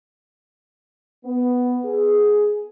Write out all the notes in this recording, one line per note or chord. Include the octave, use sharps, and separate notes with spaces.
B3
G#4